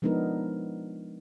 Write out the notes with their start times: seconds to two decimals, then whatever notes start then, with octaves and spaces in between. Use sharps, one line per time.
0.02 F3 G#3 B3 D4 D#4 A#4